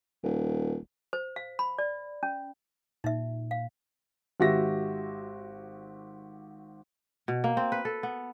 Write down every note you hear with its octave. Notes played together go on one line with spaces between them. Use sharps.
D#1
C5
F5
B5
D5
C#4
A#2 D#4 E5
F5
G#1 F#4 G4 E5 A#6
B2
A#3
C4
B4
A4
B3